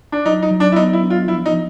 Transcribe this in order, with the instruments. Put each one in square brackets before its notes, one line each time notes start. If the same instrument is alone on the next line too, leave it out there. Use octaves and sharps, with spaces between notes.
[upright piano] D4
[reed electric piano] F#3 [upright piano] D#4
[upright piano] D#4
[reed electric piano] F#3
[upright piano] D4
E4
[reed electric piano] B3 [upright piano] D#4
[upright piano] E4
[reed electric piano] D4
[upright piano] F4
[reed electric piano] F3 [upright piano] E4
[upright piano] D#4
[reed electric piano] F3